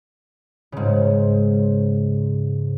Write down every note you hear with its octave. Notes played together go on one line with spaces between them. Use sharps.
G#2 C#3